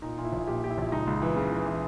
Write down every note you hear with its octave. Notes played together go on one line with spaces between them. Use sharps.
A#2 D#4
A#2
E4
A#1
A#2 G4
A#2 G4
E4
A#1
C#2 D#4
C#2
E3
C#3
E3
E3